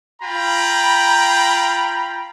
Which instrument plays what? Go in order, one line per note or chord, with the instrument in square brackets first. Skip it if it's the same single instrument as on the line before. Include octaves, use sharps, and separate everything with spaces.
[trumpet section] F4 G5 A#5 B5